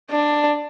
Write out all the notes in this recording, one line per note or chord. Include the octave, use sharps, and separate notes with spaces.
D4